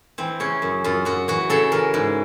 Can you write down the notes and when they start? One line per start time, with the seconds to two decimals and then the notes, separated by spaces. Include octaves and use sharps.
0.18 E3 C4
0.40 C#3 C#4
0.62 F#2
0.84 F#2 F4
1.05 F#2 F#4
1.28 E3 F#4
1.50 C#3 A4
1.72 E3 A#4
1.94 G#2